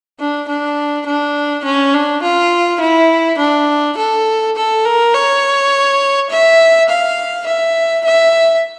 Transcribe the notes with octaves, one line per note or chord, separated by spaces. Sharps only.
D4
D4
D4
C#4
D4
F4
E4
D4
A4
A4
A#4
C#5
E5
F5
E5
E5